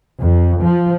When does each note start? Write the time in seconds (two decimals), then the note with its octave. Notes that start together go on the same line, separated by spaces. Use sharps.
0.20 F2
0.63 F3